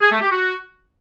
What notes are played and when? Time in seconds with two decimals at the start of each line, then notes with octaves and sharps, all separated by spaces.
0.01 G#4
0.11 A3
0.21 G4
0.31 F#4